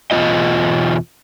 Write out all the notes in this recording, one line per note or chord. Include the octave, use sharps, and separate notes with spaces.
E2 B2 G3 C#4 F4 D#5